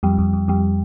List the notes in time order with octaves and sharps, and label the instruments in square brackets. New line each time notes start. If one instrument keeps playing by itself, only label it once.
[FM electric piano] F2 [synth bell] G3
[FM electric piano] F2
F2
[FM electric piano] F2 [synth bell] G3